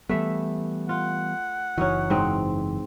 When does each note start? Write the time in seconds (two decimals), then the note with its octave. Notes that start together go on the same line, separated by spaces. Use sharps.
0.09 E3 G3 A3 B3 E5
0.89 F4 F#5
1.78 F#1 E3 C#4 D#4 F#4
2.10 G#2 C4 D#5